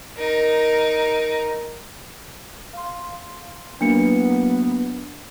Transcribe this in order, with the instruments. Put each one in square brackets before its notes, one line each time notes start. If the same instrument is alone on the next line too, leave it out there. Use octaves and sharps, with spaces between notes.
[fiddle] D#4 A#4
[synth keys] F5 C6
[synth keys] F#3 A#3 E4 [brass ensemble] B3 [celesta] D4 C#7